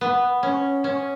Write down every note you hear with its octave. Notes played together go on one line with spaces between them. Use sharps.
B3
C#4
C#4